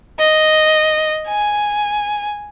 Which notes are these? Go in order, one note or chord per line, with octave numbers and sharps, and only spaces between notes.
D#5
G#5